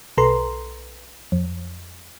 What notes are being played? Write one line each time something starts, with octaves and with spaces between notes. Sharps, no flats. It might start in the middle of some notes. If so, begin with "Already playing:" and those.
B1 A4 B4 A#5 C6
F2